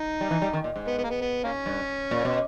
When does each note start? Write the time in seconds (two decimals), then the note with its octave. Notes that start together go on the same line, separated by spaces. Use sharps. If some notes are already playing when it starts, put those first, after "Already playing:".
Already playing: D#4
0.21 G3
0.31 E3
0.42 G3
0.53 D#3
0.64 A#2
0.76 G#2
0.87 B3
0.98 B3
1.04 A#3
1.10 B3
1.21 B3
1.44 A#3 C#4
1.66 G2
2.11 A#2
2.25 B2